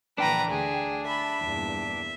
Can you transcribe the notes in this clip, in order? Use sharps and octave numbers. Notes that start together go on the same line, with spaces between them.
A#1 D3 E3 D4 B4 G5 A#5
D2 G#4
E5 A5 B5
E2 G2 A#2